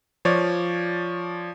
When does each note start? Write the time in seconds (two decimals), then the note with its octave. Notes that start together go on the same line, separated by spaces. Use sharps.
0.25 F3 C#5 D5